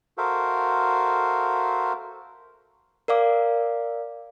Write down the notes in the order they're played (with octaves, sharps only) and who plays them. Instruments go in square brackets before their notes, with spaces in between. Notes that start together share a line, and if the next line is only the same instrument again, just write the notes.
[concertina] F#4 A4 A#4 C5 E5 F5
[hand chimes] A#4 D5 F5 D6